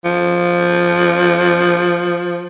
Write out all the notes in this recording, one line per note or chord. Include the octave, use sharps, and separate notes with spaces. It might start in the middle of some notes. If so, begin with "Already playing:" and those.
F3